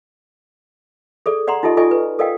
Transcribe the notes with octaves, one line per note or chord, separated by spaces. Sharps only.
G#4 A4 D5
D5 F#5 A#5 C6
D#4 F4 G4 A4 D#5
F4 A4 D5 D#5 G#5 C#6
B4
A4 A#4 D5 D#5 F5 G5